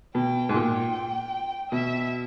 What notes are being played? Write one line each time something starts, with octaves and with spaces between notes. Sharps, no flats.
B2 G5
G#2
A#2 G5
B2 E5